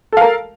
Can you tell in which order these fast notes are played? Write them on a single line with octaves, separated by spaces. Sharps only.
A4 F5 A#4